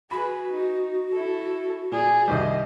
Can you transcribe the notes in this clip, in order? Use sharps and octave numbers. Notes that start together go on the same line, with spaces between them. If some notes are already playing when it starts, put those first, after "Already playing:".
F#4 G#4 B4 B5
D#4
E4 A4
A#2 G#4 D5
C2 D#3 G3 C5 D#5